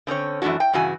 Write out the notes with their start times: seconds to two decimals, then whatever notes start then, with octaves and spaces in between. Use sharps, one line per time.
0.07 D3 C4 C#4 C#5
0.42 F#2 E3 A3 D4 F#4
0.60 G5
0.73 G2 C#3 E3 F#4 G#5